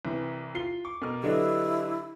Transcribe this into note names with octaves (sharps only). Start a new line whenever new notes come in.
C2 C3 E3
F4 C7 G7
C#6 D6
B2 A#4 F6
D3 F#3 D4 E4 G4 B4 D#5